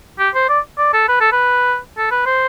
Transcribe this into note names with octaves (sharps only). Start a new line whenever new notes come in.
G4
C5
D5
D5
A4
B4
A4
B4
A4
B4
C5